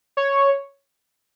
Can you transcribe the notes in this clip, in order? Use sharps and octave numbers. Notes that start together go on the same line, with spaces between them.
C#5